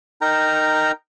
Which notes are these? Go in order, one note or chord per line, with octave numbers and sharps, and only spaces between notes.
D#4 A#4 G5 A#5